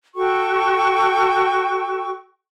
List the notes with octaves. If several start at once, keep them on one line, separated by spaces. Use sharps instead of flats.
F#4 A4 G5 C#6